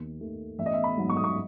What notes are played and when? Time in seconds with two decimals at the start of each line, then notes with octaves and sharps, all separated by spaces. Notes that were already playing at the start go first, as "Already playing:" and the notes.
Already playing: D#2
0.21 D#3 A3
0.59 A1 E5
0.66 D#5
0.73 E5
0.84 B5
0.97 G#2 F#3
1.10 C#6
1.17 D#6
1.24 C#6